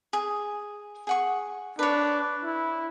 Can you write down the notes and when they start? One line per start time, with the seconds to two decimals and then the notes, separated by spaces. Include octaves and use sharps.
0.13 G#4
1.07 G#4 F#5 C#6
1.79 D4 B4 C#5
2.44 E4